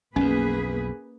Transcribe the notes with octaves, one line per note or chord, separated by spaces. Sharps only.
B1 F2 A#3 C#4 G#4 B4